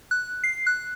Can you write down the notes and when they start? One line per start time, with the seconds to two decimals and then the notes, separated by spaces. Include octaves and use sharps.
0.11 F#6
0.44 C7
0.67 F#6